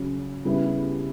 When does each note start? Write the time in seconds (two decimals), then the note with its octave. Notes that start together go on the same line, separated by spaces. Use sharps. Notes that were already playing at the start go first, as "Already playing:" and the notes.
Already playing: C#3 F#3 C#4
0.45 C#3 G3 B3 E4